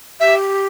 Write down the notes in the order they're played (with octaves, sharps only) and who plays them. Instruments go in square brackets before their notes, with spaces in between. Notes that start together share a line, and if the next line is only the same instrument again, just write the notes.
[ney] G4 [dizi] E5